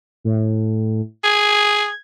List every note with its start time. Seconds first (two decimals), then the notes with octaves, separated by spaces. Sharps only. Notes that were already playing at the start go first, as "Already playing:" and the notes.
0.24 A2
1.24 G#4 G#6